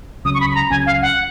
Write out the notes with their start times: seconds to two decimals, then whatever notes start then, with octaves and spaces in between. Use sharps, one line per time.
0.25 C#2 C#3 F#3 C#4 D#6
0.34 C#6
0.41 B5
0.51 B5
0.55 A#5
0.70 C#2 C#3 F#3 C#4 G#5
0.86 F5
1.02 F#5